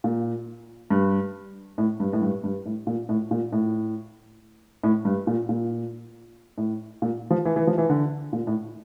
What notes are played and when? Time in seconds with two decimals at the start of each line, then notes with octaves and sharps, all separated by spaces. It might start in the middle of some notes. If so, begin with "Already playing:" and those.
0.04 A#2
0.90 G2
1.78 A2
2.00 G2
2.13 A2
2.21 G2
2.44 G2
2.66 A2
2.87 A#2
3.09 A2
3.31 A#2
3.52 A2
4.83 A2
5.05 G2
5.27 A#2
5.49 A#2
6.58 A2
7.02 A#2
7.30 F3
7.45 E3
7.56 E3
7.67 F3
7.78 E3
7.89 D3
8.33 A#2
8.47 A2